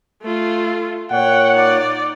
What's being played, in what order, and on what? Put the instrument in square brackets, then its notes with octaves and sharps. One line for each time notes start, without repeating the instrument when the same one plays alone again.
[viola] A3 F4
[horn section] A#2 C#5 F#5 [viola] G5
[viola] D#4 D5